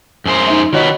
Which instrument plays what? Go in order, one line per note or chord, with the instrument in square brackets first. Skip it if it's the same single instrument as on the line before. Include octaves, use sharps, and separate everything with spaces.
[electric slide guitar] F#2 G#4 C5
[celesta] D#4 E5
[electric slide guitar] D#3 F#4 B4 [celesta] F4 C#5 D#5